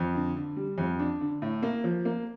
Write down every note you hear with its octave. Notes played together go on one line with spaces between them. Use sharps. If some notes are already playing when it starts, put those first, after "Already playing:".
Already playing: F2
D3
D3
G3
F2
D4
D3
A2
A#3
F3
A#3